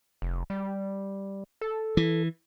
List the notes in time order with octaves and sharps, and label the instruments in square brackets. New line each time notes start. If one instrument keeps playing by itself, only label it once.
[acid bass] F1
G3
A4
[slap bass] E3